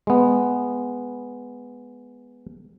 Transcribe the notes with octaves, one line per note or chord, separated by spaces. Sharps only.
G#3 B3